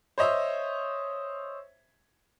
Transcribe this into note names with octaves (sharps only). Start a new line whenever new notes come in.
C5 C#5 D#5 E5